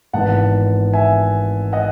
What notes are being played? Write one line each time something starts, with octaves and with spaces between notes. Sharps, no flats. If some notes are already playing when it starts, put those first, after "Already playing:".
G#1 G#2 E3 B3 D#4 F#5 A5
E5 G#5
D#5 F#5